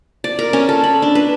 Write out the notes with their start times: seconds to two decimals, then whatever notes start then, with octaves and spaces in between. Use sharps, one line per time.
0.24 D5
0.39 A#4
0.53 C#4
0.69 A4
0.84 B5
1.02 D4
1.15 B4